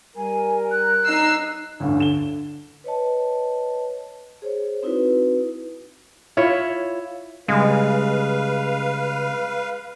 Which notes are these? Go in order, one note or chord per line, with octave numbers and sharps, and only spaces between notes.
G3 A#4 G#5
F#6
D#4 E6 C7
A1 D2 G2
D3 E7 G7
B4 C#5 D#5 A5
G#4 C5 C#5
C4 D#4 E4 F#4 B4
E4 F4 C#5 E5
C#3 G3 G#3 B4 F5